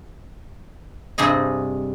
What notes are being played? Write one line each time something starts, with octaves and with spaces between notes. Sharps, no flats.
G2 C3 G3 G#4 D#5